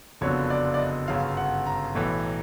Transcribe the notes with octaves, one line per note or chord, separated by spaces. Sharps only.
F#1 F2 D3 F#3 B3 C#5
D5
D5
D#5
G1 F#2 C#3 F5
F#5
A#5
B1 A2 E3 A3